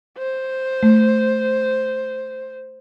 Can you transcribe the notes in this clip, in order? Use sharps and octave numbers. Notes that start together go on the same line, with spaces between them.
C5
A3